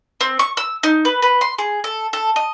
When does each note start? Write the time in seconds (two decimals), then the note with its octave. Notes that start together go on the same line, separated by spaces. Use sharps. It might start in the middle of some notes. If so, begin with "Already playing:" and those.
0.21 C4
0.39 C#6
0.57 E6
0.83 D#4
1.05 B4
1.22 B4
1.41 C6
1.59 G#4
1.84 A4
2.13 A4
2.36 D#5